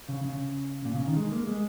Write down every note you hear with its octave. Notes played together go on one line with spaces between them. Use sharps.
C#3
C#3
A#2
C#3
D#3
G#3
A#3
G#3